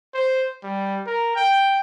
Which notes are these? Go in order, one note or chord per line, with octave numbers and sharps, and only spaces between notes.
C5
G3
A#4
G5